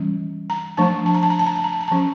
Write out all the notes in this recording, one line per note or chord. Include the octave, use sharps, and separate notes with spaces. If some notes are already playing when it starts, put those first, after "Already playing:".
Already playing: E3 G3 C#4
A#5
F3 A3 D4 A5
A5
A#5
A5
A#5
A5
A#5
A5
A#5
A5
A#5
F3 C#4 A5